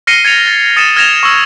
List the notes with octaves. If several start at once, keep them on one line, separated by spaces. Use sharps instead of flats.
F6 A#6 C7 C#7 D#7 G7
G#6 A6 C#7 F7
A6
D#6 A6 C#7 D#7 E7
F6 G#6 A#6 E7 F7
C#6 E6